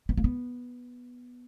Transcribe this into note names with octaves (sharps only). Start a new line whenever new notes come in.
B3
A#3
B3